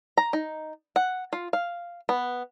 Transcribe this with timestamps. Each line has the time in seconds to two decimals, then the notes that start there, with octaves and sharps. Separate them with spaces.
0.17 A#5
0.33 D#4
0.96 F#5
1.33 F4
1.53 F5
2.09 B3